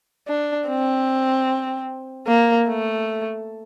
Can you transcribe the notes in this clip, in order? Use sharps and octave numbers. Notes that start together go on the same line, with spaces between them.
D4
C4
A#3
A3